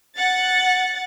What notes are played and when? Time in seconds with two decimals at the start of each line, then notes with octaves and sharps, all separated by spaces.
0.16 F#5 A6